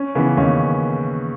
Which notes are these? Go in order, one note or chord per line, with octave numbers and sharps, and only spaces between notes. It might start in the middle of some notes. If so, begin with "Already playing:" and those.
Already playing: C#4
C#3 E3 B3
D#2 C#4